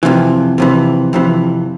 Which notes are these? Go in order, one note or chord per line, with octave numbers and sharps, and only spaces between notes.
F2 C3 E3
F2 C3 E3
F2 C3 E3